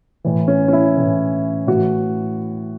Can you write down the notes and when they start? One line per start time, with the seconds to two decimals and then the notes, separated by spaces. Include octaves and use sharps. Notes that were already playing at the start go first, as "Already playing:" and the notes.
0.24 A2 E3
0.48 C#4
0.68 C#4
0.73 E4
0.97 A2 E3
1.67 A2 E3 F#4